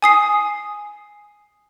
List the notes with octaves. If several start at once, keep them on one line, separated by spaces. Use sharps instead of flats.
G#5 D#6 C7